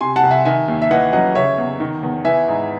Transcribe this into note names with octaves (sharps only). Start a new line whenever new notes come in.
C3 G#5 C6
F#5 A5
C2
E5 G#5
D#3 E5 G#5
D#2
E5
E3 D#5 F#5
F#2 D#5 F#5
C#3 C#5 E5
E2
D#3
E2
E3 E5 G#5
G#2